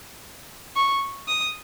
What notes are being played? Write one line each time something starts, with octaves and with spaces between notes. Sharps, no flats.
C#6
D#6